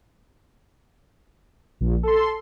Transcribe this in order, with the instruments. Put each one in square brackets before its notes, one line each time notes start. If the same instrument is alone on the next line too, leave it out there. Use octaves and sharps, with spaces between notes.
[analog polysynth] A#1
A4 C6